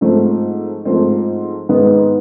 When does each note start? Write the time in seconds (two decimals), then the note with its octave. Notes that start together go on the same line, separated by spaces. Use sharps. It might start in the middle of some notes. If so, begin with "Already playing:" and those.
0.01 G#2 F3 A3 C4
0.85 G#2 F3 A3 C4
1.69 G#2 D#3 G#3 B3